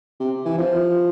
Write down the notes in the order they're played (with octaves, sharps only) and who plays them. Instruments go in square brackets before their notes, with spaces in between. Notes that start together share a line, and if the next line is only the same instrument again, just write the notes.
[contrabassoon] C3
E3
F3